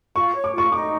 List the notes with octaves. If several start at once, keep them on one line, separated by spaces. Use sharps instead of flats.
F4 C#6
C#5
D6
F4 C#6
D#4 D6